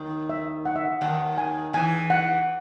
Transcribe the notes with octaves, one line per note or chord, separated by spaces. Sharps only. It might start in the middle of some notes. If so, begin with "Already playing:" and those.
Already playing: D#2 D#3
E5
F#5
E5
F#5
D#2 D#3 F#5
G#5
E2 E3 G#5
F#5